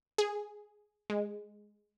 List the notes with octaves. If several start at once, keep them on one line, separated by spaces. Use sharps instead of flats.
G#4
G#3